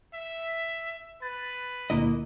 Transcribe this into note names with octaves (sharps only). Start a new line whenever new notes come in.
E5
B4 A6
C#2 A#2 D3 A#3 E4 D#5